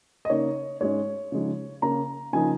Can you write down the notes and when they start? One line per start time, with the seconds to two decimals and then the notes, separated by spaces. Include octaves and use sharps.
0.25 D#5
0.29 C#3 A#3 D#4 C#5
0.80 G#2 G#3 C#4 C#5
1.32 C#3 F3 G#3 D#4
1.82 C#3 A#3 C#4 A#5
2.33 C#3 F3 A#3 D#4 G#5